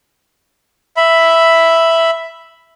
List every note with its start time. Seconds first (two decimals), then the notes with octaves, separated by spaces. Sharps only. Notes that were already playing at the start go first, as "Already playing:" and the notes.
0.97 E5 B5